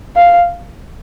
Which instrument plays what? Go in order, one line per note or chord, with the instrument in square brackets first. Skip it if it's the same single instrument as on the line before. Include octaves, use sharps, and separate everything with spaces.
[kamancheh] F5